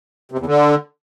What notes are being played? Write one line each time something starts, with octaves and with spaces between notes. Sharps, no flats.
C3
E2
D3